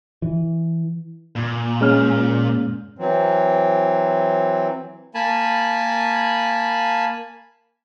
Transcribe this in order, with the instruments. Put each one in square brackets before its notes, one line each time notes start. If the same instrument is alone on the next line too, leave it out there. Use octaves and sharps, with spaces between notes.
[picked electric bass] E3
[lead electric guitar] A#2
[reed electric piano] G#3 C#4 F6
[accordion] E3 F#3 C4
[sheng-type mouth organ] A#3 G#5 A5 B5